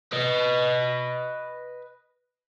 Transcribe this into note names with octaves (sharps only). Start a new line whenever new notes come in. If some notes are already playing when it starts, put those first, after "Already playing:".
B4 D#5